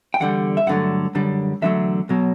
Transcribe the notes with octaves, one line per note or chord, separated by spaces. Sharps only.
G5
E2 D3 G3 F#5
E5
G2 D3 F#3 A3 F#5
F#2 D3 G3
E2 D3 F#3 A3 E5
B1 B2 F#3